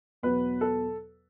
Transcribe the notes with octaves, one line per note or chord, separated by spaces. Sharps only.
E2 B2 F#3 B3 B4
A4